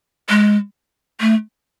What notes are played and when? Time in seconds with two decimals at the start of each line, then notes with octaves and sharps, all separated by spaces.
0.29 G#3
1.21 A3